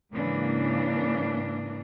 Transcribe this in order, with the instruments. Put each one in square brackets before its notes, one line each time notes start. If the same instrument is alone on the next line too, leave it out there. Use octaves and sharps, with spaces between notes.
[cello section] G#2 C#3 E3 A#3 D4